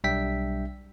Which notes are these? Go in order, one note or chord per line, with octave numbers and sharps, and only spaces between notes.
B1 G3 D4 E5 G5 B6